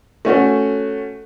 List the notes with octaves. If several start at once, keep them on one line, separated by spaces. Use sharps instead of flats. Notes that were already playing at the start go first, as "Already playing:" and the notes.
A3 C#4 F#4